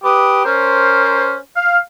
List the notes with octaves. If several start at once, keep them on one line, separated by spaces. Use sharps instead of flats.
G4 B4 D6 D#6
C#4 A#4 C5
F5